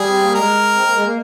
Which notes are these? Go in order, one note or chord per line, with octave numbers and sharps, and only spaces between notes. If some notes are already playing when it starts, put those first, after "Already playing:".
Already playing: G3 G#4
C4
A#3
G#3 A#4
C4
A#3
G#3
A#3